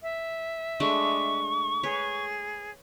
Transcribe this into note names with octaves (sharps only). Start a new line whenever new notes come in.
E5
G#3 A3 D4 C#6
G#4 B4 C#5